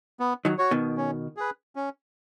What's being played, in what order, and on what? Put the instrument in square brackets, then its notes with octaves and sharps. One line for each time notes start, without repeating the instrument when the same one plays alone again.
[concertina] B3
[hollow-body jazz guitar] D#3 F#3
[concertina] F#4 C#5
[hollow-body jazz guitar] B2 D#3
[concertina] C#4
G#4 B4
C#4